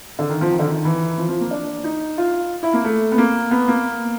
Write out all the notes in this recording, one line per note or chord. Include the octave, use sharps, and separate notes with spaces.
D3
D#3
F3
D#3
D3
D#3
E3
F3
F3
A#3
D4
D#4
F4
E4
A#3
A3
B3
A#3
B3
A#3